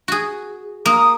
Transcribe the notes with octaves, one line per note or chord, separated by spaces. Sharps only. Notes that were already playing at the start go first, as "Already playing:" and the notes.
F#4 G#4
A#3 D#6